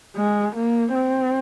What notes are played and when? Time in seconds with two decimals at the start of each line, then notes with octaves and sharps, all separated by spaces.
0.16 G#3
0.56 A#3
0.95 C4